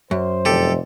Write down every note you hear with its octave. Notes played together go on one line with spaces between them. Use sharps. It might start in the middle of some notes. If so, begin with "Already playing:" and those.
F#2 C5
F1 G4 A4